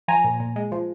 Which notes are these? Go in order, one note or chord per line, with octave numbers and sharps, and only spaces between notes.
F3 G#5 A#5
A#2
A#2
G#3
F3